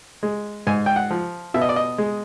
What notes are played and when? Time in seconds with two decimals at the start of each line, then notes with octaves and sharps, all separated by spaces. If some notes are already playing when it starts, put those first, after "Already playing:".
0.23 G#3
0.67 G#2 G#5
0.86 G5
0.96 F#5
1.11 F3
1.54 B2 E5
1.61 D#5
1.69 D5
1.76 D#5
1.98 G#3